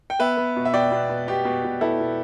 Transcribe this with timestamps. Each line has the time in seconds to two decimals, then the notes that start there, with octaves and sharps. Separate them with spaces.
0.10 G5
0.19 B3 B4 E5
0.37 B3
0.56 B2
0.65 E5
0.74 B2 D5 G5
0.92 B2
1.09 B2
1.28 B2 G4
1.45 B2
1.64 B2
1.81 B3 E4 A4
2.00 B2